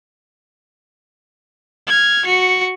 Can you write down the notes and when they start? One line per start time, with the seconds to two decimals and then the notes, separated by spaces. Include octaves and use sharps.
1.87 F6 G#6
2.25 F#4 C#7